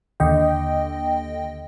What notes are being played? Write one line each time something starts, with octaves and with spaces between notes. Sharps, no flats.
D#2 D3 D#5 G5